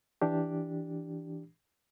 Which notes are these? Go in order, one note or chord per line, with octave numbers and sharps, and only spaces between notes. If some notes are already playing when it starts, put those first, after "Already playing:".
E3 D4 G4